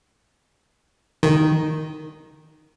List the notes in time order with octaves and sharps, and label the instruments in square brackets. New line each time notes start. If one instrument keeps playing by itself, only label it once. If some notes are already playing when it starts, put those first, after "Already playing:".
[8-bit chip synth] D#3